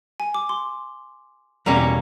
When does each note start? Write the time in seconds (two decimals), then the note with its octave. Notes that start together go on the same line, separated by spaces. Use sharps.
0.20 G#5
0.34 D6
0.49 C6
1.66 E2 B2 G3 A#3 C#4 A#5